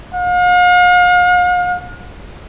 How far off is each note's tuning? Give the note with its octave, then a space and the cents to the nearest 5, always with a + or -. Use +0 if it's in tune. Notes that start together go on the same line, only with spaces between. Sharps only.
F5 +45